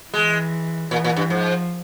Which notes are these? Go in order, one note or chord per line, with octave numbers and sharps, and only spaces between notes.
E3 G#3
A#2 E3
A#2
G2
G#2 F3